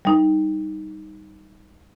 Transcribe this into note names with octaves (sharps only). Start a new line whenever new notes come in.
G3 D#4